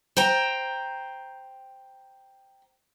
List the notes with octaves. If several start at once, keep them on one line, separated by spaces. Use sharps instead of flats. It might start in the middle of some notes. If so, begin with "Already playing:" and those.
C5 G5 A#5